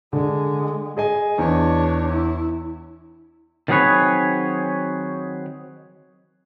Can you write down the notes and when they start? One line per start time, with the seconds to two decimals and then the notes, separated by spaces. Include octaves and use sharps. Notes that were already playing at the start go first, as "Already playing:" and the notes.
0.13 D3 G#3
0.97 G#4 D#5 G#5
1.38 E2 D4 C#5
2.12 E4
3.68 D#3 F#3 C4 G#4 B4 C#5